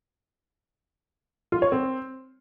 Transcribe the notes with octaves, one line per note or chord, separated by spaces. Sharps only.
F4
C#5
C4